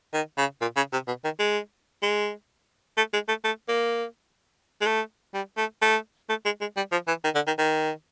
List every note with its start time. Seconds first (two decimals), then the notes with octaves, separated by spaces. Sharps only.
0.14 D#3
0.38 C#3
0.61 A#2
0.76 C#3
0.93 C3
1.07 B2
1.24 D#3
1.39 G#3
2.03 G#3
2.97 A3
3.13 G#3
3.28 A3
3.44 A3
3.68 A#3
4.81 G#3
4.86 A3
5.34 G3
5.57 A3
5.82 A3
6.29 A3
6.45 G#3
6.61 G#3
6.77 G3
6.92 F3
7.08 E3
7.24 D#3
7.35 D3
7.47 D#3
7.58 D#3